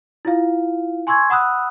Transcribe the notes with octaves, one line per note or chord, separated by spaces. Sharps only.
E4 F4 F5
G#5 C6 C#6 E6 G#6
F#5 B5 D#6 E6 F#6